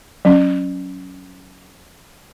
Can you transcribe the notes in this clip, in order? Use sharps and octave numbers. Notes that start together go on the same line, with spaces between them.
F#3 C#4